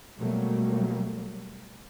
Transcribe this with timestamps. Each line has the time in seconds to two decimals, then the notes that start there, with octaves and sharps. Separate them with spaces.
0.18 B2 F#3 G3 A3 A#3